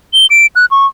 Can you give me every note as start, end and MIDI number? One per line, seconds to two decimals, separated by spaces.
0.14 0.26 103
0.30 0.46 98
0.56 0.66 90
0.71 0.86 85